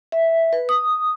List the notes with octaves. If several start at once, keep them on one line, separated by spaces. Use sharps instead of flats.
E5
B4
D#6